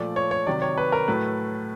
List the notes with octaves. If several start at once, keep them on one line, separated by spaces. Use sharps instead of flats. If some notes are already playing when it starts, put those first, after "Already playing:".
Already playing: A#2 F3 A3 D5
C#5
C#5
C3 D#3 F#3 D5
C#5
B4
A#4
A2 F#3 A3 B4